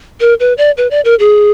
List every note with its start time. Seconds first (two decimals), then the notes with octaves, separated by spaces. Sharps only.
0.21 A#4
0.40 B4
0.58 D5
0.77 B4
0.91 D5
1.05 A#4
1.20 G#4